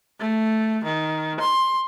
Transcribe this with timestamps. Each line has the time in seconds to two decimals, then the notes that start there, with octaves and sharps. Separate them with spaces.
0.20 A3
0.84 D#3
1.40 C6